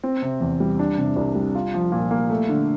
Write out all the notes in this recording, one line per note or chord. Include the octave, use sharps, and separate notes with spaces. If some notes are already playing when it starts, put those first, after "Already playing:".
C4
C3
E2
G3
D4
C3
C2
G3
F4
F3
A#2
A#3
A3
D3